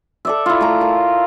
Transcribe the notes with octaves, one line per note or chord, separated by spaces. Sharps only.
A4 D5 E5
E4 F4
A3 A#5
A#4